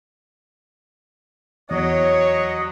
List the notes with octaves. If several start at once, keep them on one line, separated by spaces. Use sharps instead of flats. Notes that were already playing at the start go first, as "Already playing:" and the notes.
E2 F#3 C#5 D#5